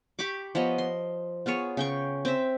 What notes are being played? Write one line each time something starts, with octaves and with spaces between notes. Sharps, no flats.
G4 B5 C#6 D6
F3 B3 C#5 D#5
C6
B3 F4 G#4 C#5
C#3 G5 C#6
C4 E5